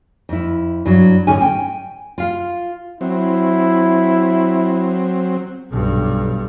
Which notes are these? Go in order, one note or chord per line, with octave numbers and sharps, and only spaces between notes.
F2 E4
G2 F#3
A2 D3 C#4 D#4 G#5
G5 G#5
F4 F5
F#3 C4 E4
B1 G2